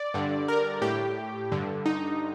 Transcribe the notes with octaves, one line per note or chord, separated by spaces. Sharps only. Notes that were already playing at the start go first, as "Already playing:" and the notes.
Already playing: D5
G2 D3
A#4
A2 G4
G2 D3
D#4